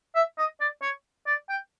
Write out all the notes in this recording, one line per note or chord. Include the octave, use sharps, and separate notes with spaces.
E5
D#5
D5
C#5
D5
G5